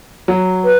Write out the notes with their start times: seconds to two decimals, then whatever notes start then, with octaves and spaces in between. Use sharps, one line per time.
0.28 F#3
0.65 B4